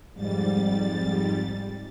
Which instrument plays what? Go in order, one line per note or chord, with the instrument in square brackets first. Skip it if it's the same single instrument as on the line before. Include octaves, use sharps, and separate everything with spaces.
[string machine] F2 G#2 G3 A6